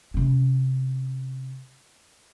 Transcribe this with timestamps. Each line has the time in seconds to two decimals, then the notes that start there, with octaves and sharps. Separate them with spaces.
0.14 C3 C#4